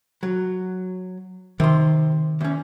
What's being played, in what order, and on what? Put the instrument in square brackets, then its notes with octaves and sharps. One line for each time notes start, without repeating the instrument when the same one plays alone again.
[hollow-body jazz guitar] F#3
[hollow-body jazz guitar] C3 C6 [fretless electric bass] D#3
[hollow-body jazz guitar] E2 C#4